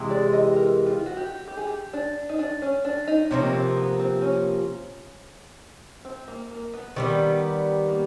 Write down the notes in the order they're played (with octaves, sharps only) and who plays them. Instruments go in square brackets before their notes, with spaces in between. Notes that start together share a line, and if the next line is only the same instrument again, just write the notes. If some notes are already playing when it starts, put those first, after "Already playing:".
Already playing: [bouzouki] C3 E3 G#3
[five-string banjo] D5
D#5
A#4
F4
F#4
G4
G4
G#4
G4
D4
D#4
D4
C#4
D4
D#4
[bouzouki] C3 F3 A#3 [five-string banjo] C#4
[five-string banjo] C4
B3
C4
C#4
C4
A#3
A#3
B3
[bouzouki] D#3 G3 B3 [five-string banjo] C4
[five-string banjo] A#3